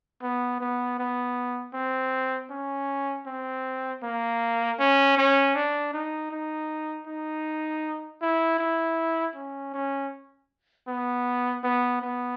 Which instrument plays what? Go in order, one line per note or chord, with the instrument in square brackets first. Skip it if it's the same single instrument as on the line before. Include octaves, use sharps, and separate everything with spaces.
[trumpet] B3
B3
B3
C4
C#4
C4
A#3
C#4
C#4
D4
D#4
D#4
D#4
E4
E4
C#4
C#4
B3
B3
B3